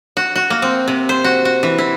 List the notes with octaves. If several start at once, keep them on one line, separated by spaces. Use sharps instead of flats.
F#4
F#4
A#3
C4
C3
C5
F#4
F#4
E3
E4